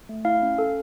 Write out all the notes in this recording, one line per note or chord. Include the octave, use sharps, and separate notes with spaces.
A3
E4 F5
C#4
A4